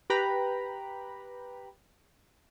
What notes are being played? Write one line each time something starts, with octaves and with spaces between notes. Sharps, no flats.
G4 B4 G5 A#5 B5